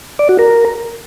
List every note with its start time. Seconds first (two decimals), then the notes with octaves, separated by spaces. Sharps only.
0.19 D5
0.29 F#4
0.39 A#4